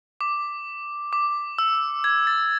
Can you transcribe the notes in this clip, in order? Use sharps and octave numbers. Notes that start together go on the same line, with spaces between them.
D6
D6
E6
G#6
A6